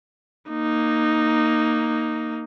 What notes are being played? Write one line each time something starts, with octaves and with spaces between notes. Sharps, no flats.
A#3 D#4